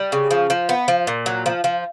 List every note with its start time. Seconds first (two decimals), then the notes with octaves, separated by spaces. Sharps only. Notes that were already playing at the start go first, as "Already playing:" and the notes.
Already playing: G3
0.12 C#3
0.31 F3
0.50 F3
0.69 B3
0.88 F3
1.07 A#2
1.26 F#3
1.46 F3
1.64 F3